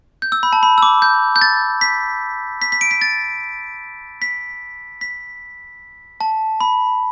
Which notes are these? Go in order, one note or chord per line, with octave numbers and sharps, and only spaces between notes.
G6
E6
B5
A5
B5
E6
D6
G6
G6
A6
B6
B6
B6
D7
B6
A6
B6
B6
A5
B5